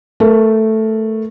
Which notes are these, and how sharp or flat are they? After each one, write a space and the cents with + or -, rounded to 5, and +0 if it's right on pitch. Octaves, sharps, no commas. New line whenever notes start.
A3 +0 A#4 +15